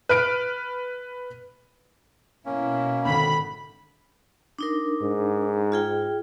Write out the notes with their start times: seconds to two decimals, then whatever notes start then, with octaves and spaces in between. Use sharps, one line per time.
0.09 B4 F6 D7
2.46 B2 A#3 C#4 E4
3.05 G#1 D3 D#3 B5
4.59 D4 D#4 A#4
5.02 G#2
5.72 F4 G#4 G5